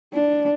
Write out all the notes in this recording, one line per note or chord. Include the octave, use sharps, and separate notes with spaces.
D4